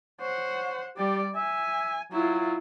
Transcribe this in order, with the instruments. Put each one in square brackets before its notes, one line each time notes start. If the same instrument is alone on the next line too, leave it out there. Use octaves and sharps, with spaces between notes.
[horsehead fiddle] C5 F#5 [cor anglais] C#5
[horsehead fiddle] G3 D5 [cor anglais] G4
[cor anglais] E5 [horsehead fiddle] G#5
[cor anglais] F#3 [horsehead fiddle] E4 F4